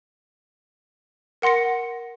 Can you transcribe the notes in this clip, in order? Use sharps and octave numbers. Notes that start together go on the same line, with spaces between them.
A#4 F#5 C6 A#6 C#7